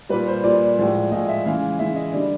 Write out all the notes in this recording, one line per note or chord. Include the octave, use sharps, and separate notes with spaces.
A#2 G3 B4
C5
A#2 G3 D5
A2 F3 G#3
A2 F3 G#3 D#5
E5
C#3 E3 G#3 F5
C#3 E3 G#3 E5
D#5
D3 G3 D5